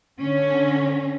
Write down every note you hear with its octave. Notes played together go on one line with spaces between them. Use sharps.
D3 C#4